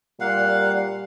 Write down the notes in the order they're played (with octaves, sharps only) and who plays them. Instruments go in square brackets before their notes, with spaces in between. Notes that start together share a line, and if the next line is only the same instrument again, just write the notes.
[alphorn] A#2 [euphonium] G3 [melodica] F5 F#5